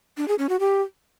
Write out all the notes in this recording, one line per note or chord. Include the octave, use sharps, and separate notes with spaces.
D4
G#4
C#4
F#4
G4